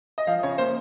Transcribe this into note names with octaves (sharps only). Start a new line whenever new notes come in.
D#5
F3 F5
C#3 C#5
A#3 C5